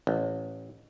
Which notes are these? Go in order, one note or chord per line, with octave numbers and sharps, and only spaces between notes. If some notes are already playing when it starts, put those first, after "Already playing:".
A1